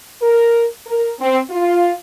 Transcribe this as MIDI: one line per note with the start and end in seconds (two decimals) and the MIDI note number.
0.22 0.65 70
0.87 1.13 70
1.20 1.40 60
1.50 1.94 65